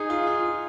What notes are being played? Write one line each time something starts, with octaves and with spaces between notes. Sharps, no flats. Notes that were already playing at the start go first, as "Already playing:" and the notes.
Already playing: D#4 G#4
F4
F4